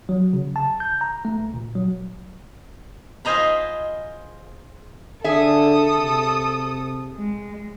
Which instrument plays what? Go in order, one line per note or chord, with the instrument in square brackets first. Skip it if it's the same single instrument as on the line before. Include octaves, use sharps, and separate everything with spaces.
[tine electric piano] F#3
C#3
A5
G6
A#5
A3
C#2
A#2
F#3
[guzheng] F4 G#4 C5 D#5 A#5 B5
[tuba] D3 [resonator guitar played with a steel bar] G#4 E5 [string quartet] A4 D#6
[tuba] C3
[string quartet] G#3